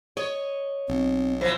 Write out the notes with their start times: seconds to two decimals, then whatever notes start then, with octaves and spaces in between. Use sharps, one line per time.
0.17 C#5 D#5
0.88 B1 C4
1.41 E3 F3 C5